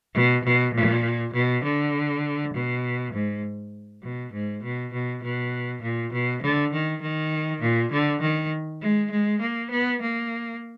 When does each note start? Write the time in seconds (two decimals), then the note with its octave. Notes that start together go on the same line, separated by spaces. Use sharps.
0.14 B2
0.44 B2
0.74 A#2
1.33 B2
1.64 D3
2.53 B2
3.13 G#2
4.03 B2
4.33 G#2
4.63 B2
4.93 B2
5.23 B2
5.82 A#2
6.12 B2
6.42 D3
6.73 D#3
7.01 D#3
7.61 A#2
7.92 D3
8.21 D#3
8.81 G#3
9.11 G#3
9.41 A#3
9.71 B3
10.01 A#3